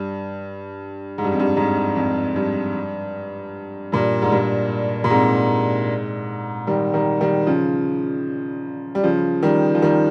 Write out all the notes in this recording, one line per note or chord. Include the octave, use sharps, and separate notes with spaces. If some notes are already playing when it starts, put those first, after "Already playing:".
Already playing: G2
G#2
G2
F2
G2
F2 G#2
F2
G2
G2 A#2
G#2
G2 A#2
A#2
G#2 C3
D#3 G3
D#3 G3
D#3 G3
C#3 F3
G3
C#3 F3
D#3 G3
F3
D#3 G3